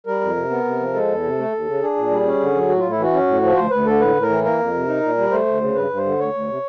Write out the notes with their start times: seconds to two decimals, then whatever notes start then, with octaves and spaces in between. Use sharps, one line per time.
0.07 G3 A#4
0.21 F2
0.36 C3
0.50 B3
0.65 C3
0.79 F3
0.94 G#3 A4
1.08 E2
1.23 C3
1.38 A3
1.52 D#2
1.66 C#3
1.81 D4 G#4
1.96 A#2
2.10 G3
2.25 C#4
2.40 D3
2.55 F#3
2.68 A2 F#4
2.80 A2 F4
2.91 E4
2.98 E3 F#4
3.13 C#4
3.27 A2
3.42 F3
3.56 D2 C5
3.71 D2 B4
3.86 D3 A4
4.00 A2 B4
4.16 A2
4.22 A#4
4.29 E3
4.44 A#3 A#4
4.59 F2
4.74 C3
4.87 D#4
5.02 A#2
5.17 G3
5.31 A3 C5
5.46 D2
5.61 C#3
5.75 G2 B4
5.89 G2
5.97 C5
6.05 D3
6.19 D2 C#5
6.33 D2
6.49 C3